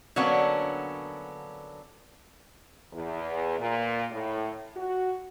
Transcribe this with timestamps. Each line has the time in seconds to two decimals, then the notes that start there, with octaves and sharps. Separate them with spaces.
0.16 D3 F#3 A#3 B3 C#4 D4
2.93 E2
3.59 A#2
4.12 A2
4.77 F#4